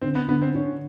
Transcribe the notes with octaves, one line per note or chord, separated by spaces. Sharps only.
D3 C4
B3
D3 B3
C4
D3 C#4